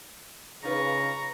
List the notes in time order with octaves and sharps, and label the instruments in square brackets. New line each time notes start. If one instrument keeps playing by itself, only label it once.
[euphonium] C#3 [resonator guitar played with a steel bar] D#4 F4 B4 [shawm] A#5 [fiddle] C#6